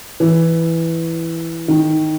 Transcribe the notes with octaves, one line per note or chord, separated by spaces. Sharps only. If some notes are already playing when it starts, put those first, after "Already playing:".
E3
D#3